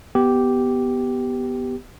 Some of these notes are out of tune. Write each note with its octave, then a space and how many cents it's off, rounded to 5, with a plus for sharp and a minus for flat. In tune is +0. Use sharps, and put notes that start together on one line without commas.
B3 +0 G4 -5